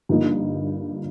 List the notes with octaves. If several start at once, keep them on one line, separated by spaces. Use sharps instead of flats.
G2 D3 F3 A#3 D#4